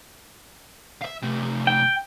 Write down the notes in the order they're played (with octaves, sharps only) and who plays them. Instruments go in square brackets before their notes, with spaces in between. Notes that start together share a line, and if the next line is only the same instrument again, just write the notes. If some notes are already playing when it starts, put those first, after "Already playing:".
[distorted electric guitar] E5 F5
C3 A3
[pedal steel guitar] G5